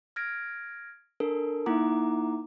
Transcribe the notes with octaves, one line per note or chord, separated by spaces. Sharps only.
F6 G#6 A#6 D7
D4 A4 A#4
A#3 D#4 E4 F#5 A#5 D6